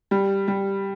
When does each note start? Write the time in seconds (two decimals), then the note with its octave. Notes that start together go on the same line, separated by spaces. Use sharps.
0.11 G3
0.48 G3